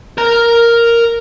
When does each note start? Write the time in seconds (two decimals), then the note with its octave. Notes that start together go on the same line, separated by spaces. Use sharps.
0.18 A#4 A#5